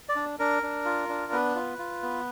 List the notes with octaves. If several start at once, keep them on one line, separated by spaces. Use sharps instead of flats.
D5
D4
D4 A#4
D4
F4
D4
B3 B4
F4
F4
B3